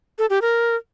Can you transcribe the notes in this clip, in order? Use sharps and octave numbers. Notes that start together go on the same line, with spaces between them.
A4
G4
A#4